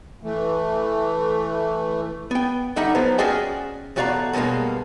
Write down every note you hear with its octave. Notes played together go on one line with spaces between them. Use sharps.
E3 A3
B3 G5
D3 G3 D#4 E5 F#5
F3 F#3 B3 C5
C#4 F#4 G#4 D5 E5 G5
E2 A2 F#4 D5 F5 A#5
G2 B2 G3 G#3 A#3